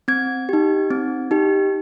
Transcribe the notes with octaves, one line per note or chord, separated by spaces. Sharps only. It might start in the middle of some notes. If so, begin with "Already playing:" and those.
C4 G#6
D#4 G4
C4
D#4 G4